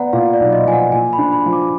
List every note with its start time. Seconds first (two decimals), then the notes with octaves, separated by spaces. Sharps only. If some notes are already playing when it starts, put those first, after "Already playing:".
Already playing: B3 D5 F#5 A#5
0.13 A#2 F5
0.34 D5
0.40 B1
0.53 D#5
0.66 F3 G#5
0.73 F#5
0.92 A#2 G#5
1.13 B5
1.18 D4
1.32 B5
1.46 F3
1.53 D6